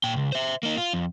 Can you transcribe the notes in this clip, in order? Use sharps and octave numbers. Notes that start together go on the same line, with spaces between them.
A#2 G5
C#2
C5 E5
A#3 D#4
F4
F2